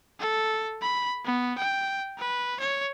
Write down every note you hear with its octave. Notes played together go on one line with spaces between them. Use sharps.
A4
B5
B3
G5
B4
C#5